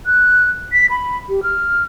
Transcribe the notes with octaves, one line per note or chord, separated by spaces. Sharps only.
F#6
B6
B5
G4
F6